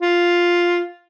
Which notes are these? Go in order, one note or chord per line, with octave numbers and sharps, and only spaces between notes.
F4